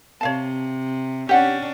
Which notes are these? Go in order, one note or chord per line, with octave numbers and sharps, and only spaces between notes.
C3 C#5 F5 A5
C#4 D4 G4 F#5